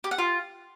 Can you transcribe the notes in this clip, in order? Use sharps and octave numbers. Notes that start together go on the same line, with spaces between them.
G4
F#5
F4